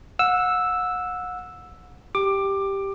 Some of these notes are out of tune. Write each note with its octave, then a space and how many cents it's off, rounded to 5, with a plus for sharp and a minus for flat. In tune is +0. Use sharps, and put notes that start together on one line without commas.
F#5 -35 E6 +0
G4 +0 D6 +15